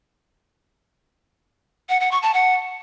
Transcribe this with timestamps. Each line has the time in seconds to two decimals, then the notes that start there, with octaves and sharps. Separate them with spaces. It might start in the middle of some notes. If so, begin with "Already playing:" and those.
1.89 F#5
2.00 F#5
2.11 C#6
2.23 A5
2.34 F#5